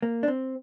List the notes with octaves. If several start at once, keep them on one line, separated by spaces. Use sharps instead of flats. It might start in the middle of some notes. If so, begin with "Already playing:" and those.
A#3
D4
C4